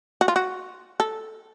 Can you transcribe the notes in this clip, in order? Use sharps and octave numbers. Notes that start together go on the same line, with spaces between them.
F#4
F4
F#4
A4